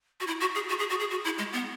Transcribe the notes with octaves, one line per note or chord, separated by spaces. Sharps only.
F#4
E4
F#4
G#4
F#4
G#4
F#4
G#4
F#4
E4
G#3
B3